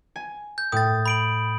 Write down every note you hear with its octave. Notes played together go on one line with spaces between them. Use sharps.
G#5
G6
A2 D#6 A6
B5 D7 F#7